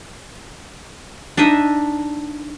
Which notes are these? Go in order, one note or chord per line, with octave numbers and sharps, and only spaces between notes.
D4 D#4 D#5 E5